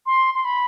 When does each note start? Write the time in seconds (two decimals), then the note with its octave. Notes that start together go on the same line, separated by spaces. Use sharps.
0.06 C6
0.34 C6
0.45 B5